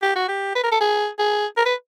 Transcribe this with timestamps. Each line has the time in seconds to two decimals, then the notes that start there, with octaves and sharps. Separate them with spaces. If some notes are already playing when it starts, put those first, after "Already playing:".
0.02 G4
0.15 F#4
0.28 G4
0.55 B4
0.63 A#4
0.71 A4
0.80 G#4
1.19 G#4
1.57 A#4
1.65 B4